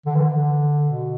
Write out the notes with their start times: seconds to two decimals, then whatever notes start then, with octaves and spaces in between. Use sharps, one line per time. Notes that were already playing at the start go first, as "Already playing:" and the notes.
0.06 D3
0.15 E3
0.25 D3
0.87 B2